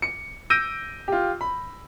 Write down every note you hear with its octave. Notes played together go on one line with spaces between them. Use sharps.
C#7
E6 G6 A#6 D7 D#7
F4 G4
B5